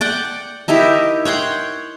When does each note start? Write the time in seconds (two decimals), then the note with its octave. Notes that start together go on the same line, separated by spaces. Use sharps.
0.01 D5 F#5 G5
0.68 D#4 E4 G4 A#4
1.25 C#5 F#5 G5 C6